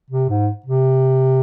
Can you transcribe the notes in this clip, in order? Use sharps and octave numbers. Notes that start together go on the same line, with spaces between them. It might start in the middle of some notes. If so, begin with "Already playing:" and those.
C3
G#2
C3